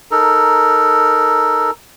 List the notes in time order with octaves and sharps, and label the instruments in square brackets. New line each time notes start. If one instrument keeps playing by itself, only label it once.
[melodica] D#4 A4 A#4